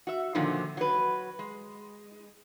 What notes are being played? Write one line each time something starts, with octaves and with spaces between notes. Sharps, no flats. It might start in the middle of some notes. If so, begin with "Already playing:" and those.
F#4 E5
A#2 D3 D#3 F3 F#3
F#3 B4
G#3